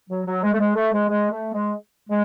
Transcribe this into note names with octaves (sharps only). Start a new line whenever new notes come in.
F#3
F#3
G#3
A3
G#3
A3
G#3
G#3
A3
G#3
G#3